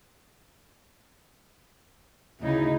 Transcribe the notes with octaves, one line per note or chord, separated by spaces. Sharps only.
D2 C#3 D#4 E4